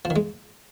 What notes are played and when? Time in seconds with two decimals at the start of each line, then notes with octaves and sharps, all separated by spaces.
0.05 F3
0.10 D#3
0.16 G#3